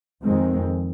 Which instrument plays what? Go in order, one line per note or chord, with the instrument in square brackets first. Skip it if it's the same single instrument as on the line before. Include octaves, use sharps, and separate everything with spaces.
[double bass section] F2 D#3 G#3 C4